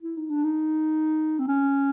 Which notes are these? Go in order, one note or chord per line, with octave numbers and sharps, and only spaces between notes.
E4
D#4
D4
D#4
C4
C#4